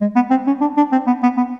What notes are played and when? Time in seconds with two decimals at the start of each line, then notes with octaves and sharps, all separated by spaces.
0.01 G#3
0.15 B3
0.30 C4
0.47 C#4
0.61 D4
0.77 D4
0.92 C4
1.07 B3
1.23 B3
1.37 B3